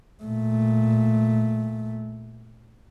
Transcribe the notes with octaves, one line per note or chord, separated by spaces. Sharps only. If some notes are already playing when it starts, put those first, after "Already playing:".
A#2 A3